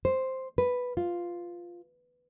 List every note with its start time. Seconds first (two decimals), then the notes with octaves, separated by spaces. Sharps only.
0.05 C5
0.58 B4
0.97 F4